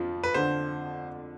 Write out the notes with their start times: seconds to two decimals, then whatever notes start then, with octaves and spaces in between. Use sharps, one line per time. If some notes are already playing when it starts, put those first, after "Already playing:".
Already playing: F2 F3
0.24 B4
0.34 D3 C5